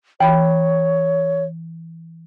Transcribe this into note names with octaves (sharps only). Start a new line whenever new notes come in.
E3 C#5 G5 B5